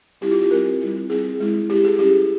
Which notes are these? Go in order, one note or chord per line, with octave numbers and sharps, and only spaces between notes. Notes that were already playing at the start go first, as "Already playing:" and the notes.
G3 C4 E4 G4
F4
G4
G3 C4 E4 A#4
G3 C4 E4
G3 C4 E4 G#4
G#3 E4
G#3 E4 G4
G#4
G3 C#4 E4 G4